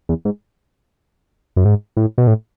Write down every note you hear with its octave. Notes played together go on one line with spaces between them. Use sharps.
E2
G#2
F#2
G#2
A2
B2
A2